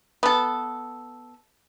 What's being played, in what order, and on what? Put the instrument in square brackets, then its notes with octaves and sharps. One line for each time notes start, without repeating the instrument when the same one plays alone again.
[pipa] B3 A4